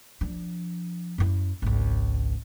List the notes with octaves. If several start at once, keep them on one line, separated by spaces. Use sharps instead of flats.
F3 D4
F#2 E4
G#1 C#2